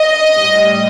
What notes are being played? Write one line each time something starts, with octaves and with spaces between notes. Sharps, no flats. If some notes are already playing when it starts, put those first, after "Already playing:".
Already playing: D#5
A2 G3